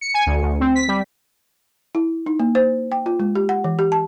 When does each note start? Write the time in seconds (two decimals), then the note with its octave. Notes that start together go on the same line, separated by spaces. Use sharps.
0.01 C#7
0.14 G#5
0.26 D2
0.43 D2
0.60 C4
0.75 B6
0.88 G3
1.95 E4
2.26 D#4
2.40 A#3
2.55 C5
2.92 G5
3.06 F4
3.20 G#3
3.35 G4
3.49 F#5
3.64 E3
3.79 G4
3.92 A5